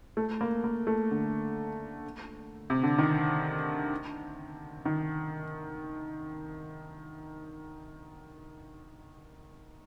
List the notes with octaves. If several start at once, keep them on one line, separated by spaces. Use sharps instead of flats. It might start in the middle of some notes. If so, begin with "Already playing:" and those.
A3
A#3
A#3
A3
D3
C3
D3
D#3
D#3